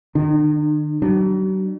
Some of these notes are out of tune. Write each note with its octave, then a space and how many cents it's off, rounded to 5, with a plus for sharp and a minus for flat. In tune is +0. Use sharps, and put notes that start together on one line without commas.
D#3 -40 D4 +40
F#3 +45 D4 +30